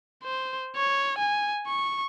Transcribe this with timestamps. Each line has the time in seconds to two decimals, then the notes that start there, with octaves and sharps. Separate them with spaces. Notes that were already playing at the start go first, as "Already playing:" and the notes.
0.24 C5
0.76 C#5
1.18 G#5
1.67 C#6